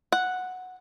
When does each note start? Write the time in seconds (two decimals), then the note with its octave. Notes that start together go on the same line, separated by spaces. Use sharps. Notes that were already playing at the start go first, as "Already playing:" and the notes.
0.12 F#5